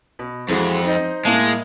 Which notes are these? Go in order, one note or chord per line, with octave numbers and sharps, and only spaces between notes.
B2
F2 E3 G#3 F#4
D#4 C5 D#5
A2 G#3 A#3 A5